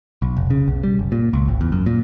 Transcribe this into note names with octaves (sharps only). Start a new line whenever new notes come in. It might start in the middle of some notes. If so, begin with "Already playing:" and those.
B1
F1
C#3
B1
G3
F#1
A#2
C#2
G#1
E2
F#2
A#2